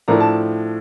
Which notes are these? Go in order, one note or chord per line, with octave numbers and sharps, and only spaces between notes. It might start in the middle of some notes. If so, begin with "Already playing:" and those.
A2 F3 A3 D4 A#5
A5